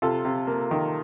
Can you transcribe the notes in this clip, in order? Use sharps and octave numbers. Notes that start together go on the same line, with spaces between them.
C3 F4 A4
C3
A#3
D#3